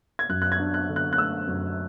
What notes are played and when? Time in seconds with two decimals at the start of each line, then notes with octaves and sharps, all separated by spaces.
0.19 G#6
0.29 F#2 F#6
0.42 F#6
0.52 G#6
0.59 D4
0.74 F#6
0.89 D3
0.96 F#6
1.13 F#6
1.18 A3 E6
1.47 F#2